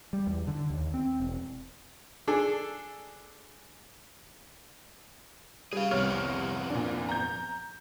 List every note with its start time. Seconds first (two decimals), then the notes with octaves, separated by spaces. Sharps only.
0.13 G3
0.27 E2
0.47 D3
0.70 D#2
0.94 C4
1.20 E1
2.28 D4 G#4 A4
5.73 G3 G#4 F5
5.91 C2 F2 B3 C#5 F6
6.70 A#2 D4
7.09 A#5 G6